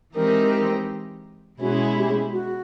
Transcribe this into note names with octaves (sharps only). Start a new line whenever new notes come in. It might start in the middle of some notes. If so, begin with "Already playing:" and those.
E3 G#3 C4 D#4 G4 A#4
B2 G#3 C#4 E4 F#4
G4
F#4